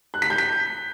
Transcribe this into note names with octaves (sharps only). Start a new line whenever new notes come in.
F#6
B6
G6
B6